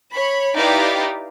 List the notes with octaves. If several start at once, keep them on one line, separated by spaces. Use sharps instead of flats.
C#5 B5
D#4 E4 G4 B4 D5 F5